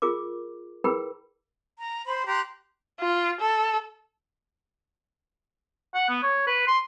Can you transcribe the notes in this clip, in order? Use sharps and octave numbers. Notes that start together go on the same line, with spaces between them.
F4 G#4 A#4 D6
E4 G#4 A#4 B4 G5 B5
A#5
C5 B5 C6
G4 A#5 C6 F#6
F4
A4
F#5
B3
C#5
B4
C6